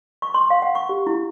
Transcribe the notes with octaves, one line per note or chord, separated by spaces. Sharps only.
C#6
C6
F5
F#5
C#6
G4
E4